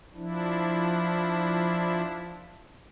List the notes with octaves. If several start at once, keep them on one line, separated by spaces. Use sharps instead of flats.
F3 D4 E4